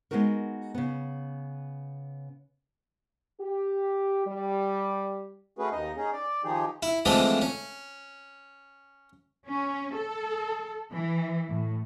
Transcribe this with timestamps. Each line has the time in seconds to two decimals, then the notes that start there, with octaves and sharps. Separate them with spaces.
0.11 G#3 A#3 B3 D#4 F#4 A#4
0.75 C#3 B3
3.40 G4
4.26 G3
5.59 A3 C#4 F#4 G#4 B4
5.72 D#2 D#4 D#5
5.97 C#4 D#4 G#4
6.13 D5
6.44 D#3 F3 D#4 G4 G#4
6.83 E4
7.05 D3 E3 F3 G#3 A3 C4
7.41 C#4
9.48 C#4
9.94 A4
10.92 E3
11.49 A2